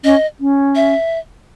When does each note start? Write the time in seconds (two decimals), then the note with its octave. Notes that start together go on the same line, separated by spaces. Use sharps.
0.04 C#4 D#5
0.40 C#4
0.76 E5